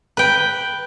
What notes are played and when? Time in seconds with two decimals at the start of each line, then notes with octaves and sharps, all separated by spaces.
0.17 B4 G5